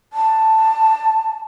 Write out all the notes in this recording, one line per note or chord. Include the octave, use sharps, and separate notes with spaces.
A5